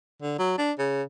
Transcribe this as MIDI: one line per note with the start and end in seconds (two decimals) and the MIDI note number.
0.22 0.38 50
0.39 0.56 54
0.58 0.72 62
0.79 1.03 49